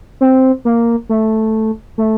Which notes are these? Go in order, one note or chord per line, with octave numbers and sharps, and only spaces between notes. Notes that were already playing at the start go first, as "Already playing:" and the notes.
C4
A#3
A3
A3